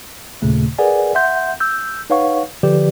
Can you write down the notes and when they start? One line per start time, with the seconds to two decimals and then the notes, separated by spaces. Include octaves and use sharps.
0.42 D#2 A#2 C#3 A3
0.78 G#4 A#4 B4 D5 F#5 G#5
1.15 E5 F#5 C6 G6
1.60 E6 G6
2.10 D#4 B4 C#5 F5 F#5 C#6
2.63 D3 F3 G4 B4 D5